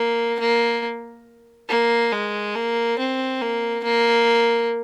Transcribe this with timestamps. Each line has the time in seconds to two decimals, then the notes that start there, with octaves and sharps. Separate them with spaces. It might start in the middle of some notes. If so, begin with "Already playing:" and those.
Already playing: A#3
0.39 A#3
1.69 A#3
2.12 G#3
2.56 A#3
2.99 C4
3.41 A#3
3.84 A#3